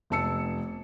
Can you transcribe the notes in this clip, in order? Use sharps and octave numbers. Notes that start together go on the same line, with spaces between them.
F1 B3 A5 E6 C#7